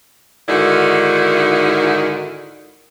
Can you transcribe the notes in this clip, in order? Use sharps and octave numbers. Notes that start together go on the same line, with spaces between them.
G#2 D3 D#3 E4 F#4